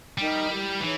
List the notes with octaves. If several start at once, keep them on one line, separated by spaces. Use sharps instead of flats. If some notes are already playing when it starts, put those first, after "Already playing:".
G3 D#4 A#4 D#5 G5
E4 G4 A#4
E3 D#4 G#4 C#5